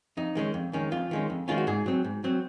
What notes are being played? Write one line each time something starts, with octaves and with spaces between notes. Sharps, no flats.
F2 D#4
D#3 G#3 C#4
F2
D#3 G#3 C#4
F2 F4
D#3 G#3 C#4
F2
D#3 G#3 C#4 F4
F#4
G#2 G#4
F#3 C4
G#2
F#3 C4